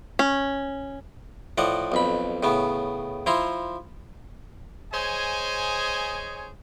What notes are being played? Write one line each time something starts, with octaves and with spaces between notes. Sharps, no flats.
C#4
A2 F3 D5 D#5 F#5
B1 F2 B5
A2 C#3 B3
F3 E4 A#5 C6
G#4 C5 C#5 D#5 G#5